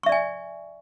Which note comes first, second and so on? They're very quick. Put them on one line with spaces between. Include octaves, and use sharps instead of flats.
C#6 E5 D5 G#5